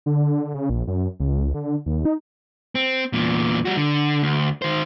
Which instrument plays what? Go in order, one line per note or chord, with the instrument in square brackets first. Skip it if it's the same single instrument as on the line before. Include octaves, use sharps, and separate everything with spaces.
[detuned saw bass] D3
C#3
A#1
F#2
C#2
D3
D#2
D#4
[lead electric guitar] C4
E2 A#2
G3 F#4
D3
D2
D#3 C5